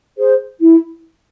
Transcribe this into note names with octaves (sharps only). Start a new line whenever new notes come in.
G#4 C5
E4